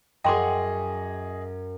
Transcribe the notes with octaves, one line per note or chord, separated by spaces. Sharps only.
F#2 G#4 D#5 G5 C6 D6